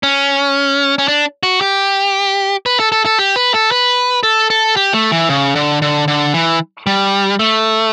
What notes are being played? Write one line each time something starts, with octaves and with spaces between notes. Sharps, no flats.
C#4
C#4
D4
F#4
G4
B4
A4
A4
A4
G4
B4
A4
B4
A4
A4
G4
A3
E3
C#3
D3
D3
D3
E3
G3
A3